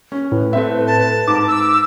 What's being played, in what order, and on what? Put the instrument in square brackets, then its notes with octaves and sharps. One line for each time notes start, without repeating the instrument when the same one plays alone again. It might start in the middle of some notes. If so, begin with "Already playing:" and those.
[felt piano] C#4
[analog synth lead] A2 [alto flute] B4
[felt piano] A3 C4 E5
[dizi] A5
[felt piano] G#2 [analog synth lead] D6
[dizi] E6